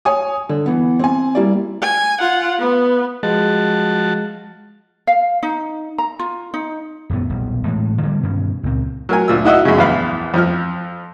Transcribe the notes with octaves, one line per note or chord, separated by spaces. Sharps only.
C#5 G#5 D#6
D3
E3 B3
C4 G#5
G3 A#3 E4 D5
G#5
F4 F#5
B3
F3 G#3 F#4 A5
F5
D#4
A#5
F4
D#4
D#1 F#2 A2 B3
D#1 B1
A2 E3 G#3
D3 G3 A#3
G2 B2 D#3 C#4
C#2 A#2 C4
F#3 A#4 G#5
D2 A#2 E6
D#4 E4 F#4 D#5 E5
F#2 C#3
A#1 E2 E4 F5 B5
F2 F3 F6